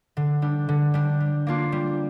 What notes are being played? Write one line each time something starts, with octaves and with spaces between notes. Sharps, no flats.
D3
G3 D4
D3
G3 D4
G3
A#3 D4 F4
G3